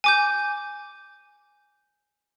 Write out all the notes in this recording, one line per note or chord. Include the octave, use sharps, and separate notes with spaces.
G#5 D6 G6